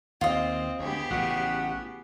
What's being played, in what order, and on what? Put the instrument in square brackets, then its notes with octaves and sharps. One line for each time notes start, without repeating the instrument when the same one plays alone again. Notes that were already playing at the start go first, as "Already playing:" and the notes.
[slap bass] D#2 [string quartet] C4 [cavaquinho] F4 D#5
[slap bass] D2 [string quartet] B3 G4 G#4
[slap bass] A1 C#3 [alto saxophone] F#4